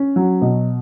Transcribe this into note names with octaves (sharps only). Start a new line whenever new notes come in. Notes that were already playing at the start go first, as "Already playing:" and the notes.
Already playing: C#4
F#3
B2